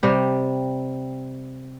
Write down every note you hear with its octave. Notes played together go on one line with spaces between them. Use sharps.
C3 G3 G4